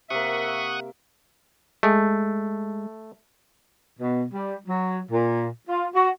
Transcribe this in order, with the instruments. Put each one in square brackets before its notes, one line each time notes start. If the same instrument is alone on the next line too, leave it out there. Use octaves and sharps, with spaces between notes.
[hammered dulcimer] C3 A#3 [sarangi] E5 [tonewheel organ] F#5 C#6 D#6
[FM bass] G#3 [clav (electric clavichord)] A3
[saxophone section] B2
G3
F#3
A#2
F4
F#4